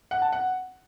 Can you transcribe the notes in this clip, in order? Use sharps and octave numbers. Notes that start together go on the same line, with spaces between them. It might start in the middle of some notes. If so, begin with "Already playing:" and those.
F#5
A5
F#5